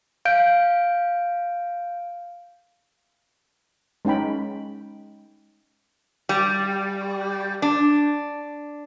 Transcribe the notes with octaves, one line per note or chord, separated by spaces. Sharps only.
F5 G6 D7
G#3 C#4 D#4 G5 B5
G3
D4